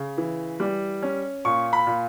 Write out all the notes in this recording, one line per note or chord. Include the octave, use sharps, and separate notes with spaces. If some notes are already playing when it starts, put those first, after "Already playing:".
Already playing: C#3
E3
G3
C#4
A#2 C#6
B5
A#2